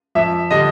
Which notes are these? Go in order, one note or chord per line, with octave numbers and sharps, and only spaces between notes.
F2 E5
D3 G3 D#5